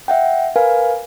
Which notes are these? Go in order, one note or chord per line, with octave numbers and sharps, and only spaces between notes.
E5 F#5 G5
A#4 B4 F5 G#5